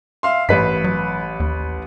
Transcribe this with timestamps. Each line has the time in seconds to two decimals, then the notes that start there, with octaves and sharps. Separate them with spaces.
0.23 E5 F5 C6
0.49 A1 G2 B4 B6
0.84 F#3
1.40 D#2